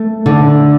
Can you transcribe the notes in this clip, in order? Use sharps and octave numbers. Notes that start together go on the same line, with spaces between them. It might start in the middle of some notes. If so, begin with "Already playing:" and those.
Already playing: A3
D3